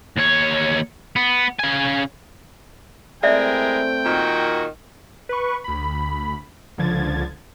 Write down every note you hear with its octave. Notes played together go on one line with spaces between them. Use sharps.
D#2 C#5
B3
C#3 G#5
G#3 A3 C4 E4 A#4 D5 E5 G5
A#2 D#3 F#4
B4 C#6
D2 B5
C#2 D3 F3 G#6 A6